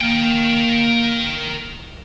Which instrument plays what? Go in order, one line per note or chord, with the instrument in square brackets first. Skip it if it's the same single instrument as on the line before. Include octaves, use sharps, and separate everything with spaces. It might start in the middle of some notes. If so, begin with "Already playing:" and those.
[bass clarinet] A#3 [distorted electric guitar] A#4 G5